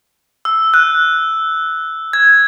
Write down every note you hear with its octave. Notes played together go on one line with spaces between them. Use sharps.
E6
F#6
G#6